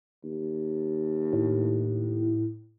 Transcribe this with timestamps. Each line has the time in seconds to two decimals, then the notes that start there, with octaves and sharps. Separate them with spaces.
0.24 D#2
1.33 A2